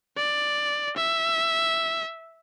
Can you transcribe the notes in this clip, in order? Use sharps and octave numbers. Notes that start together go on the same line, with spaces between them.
D5
E5